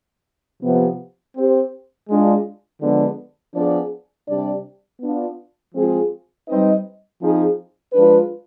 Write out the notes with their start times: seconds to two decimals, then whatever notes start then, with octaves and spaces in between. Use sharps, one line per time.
0.63 C3 F3 B3
1.36 C4 G4 C5
2.10 G#3 D4 F4
2.82 D3 F3 G#3 B3 D4
3.55 F3 B3 D4 G#4 D5
4.28 C3 G3 D4 G4 D5
5.01 B3 D4 F4
5.75 F3 G#3 C4 F4 G#4
6.48 G3 C4 D#4 B4 D#5
7.21 F3 C4 D#4 G#4
7.94 F3 G#3 D4 F4 B4